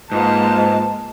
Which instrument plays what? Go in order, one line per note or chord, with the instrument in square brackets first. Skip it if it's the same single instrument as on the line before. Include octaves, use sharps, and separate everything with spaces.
[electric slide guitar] G#2 [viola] A#3 A5 [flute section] F4 B4 D#5